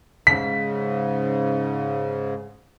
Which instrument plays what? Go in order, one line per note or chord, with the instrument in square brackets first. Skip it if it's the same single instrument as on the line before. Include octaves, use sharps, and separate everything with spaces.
[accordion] G#2 C#3 [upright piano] B6